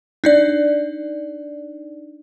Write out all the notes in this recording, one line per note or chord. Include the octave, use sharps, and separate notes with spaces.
D4 D#4 D5